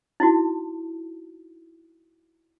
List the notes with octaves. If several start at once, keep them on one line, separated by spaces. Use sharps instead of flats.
D#4 E4 F#4